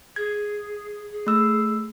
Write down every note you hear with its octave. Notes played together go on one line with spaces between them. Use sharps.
G#4 G#6
G#4
A3 E6